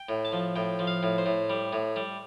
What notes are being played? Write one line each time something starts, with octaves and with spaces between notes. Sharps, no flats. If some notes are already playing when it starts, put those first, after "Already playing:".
Already playing: G5
A2
A5
F3
A2 G5
F3
F5
A2
C5
A2
G3
A2
G3